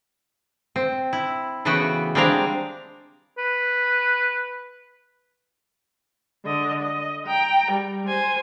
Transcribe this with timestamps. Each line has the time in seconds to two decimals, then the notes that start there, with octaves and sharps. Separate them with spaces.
0.76 C4
1.13 E4
1.65 C#3 E3 A3 B3 F#4 G5
2.15 G3 G#3 C4 D4 A#4 F5
3.38 B4
6.44 D3 D#5
6.82 D#5
7.27 G5 A#5
7.72 G3
8.07 C5 G#5